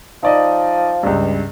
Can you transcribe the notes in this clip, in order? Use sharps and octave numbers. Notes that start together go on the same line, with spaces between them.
F3 D#4 D5 D#5
C#2 G2